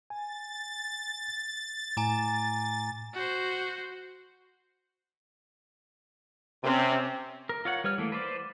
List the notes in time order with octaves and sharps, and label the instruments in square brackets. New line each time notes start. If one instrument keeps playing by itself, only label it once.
[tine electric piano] G#5 [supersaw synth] A6
[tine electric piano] A2 [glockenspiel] G#5 A#5 D6
[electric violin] F#4 C5
[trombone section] C3 [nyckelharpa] C4 C#4
[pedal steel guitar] A#4
F4 C#5 F#5
G3 B4 C#5 F6
E3 A3 A#3
B4 C5 D5